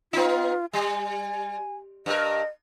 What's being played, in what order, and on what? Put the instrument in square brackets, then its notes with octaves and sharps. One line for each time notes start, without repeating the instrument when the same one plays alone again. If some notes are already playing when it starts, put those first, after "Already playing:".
[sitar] B3 D#4 [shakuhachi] F4
[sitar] G3 [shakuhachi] G#5
[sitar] G2 A#4 [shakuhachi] D#5